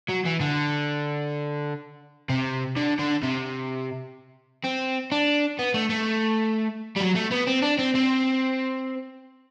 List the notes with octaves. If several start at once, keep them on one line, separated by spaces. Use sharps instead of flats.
F#3
E3
D3
C3
D3
D3
C3
C4
D4
B3
A3
A3
G3
F#3
A3
B3
C4
D4
C4
C4